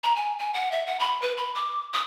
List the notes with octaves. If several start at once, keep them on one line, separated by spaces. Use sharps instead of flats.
A#5
G#5
G#5
F#5
E5
F#5
B5
B4
B5
D6
D#6